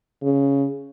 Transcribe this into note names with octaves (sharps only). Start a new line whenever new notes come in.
C#3